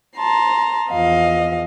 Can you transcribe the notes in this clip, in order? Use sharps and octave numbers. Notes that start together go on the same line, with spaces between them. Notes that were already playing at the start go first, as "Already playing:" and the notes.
A5 A#5 C6
E2 F3 D#5 F5